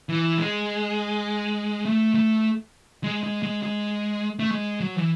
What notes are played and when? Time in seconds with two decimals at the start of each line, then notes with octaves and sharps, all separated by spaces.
0.09 E3
0.38 G#3
1.85 A3
2.15 A3
3.04 G#3
3.23 G#3
3.43 G#3
3.63 G#3
4.39 A3
4.51 G#3
4.81 F#3
4.96 E3